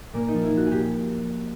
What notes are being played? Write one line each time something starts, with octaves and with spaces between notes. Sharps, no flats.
A#2 A#3
F3 D#4
E4
F3 F#4
A#2 G4 G#4